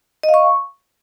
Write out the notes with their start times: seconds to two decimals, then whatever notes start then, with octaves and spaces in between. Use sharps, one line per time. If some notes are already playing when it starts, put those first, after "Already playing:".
0.23 D#5
0.29 F5
0.34 C#6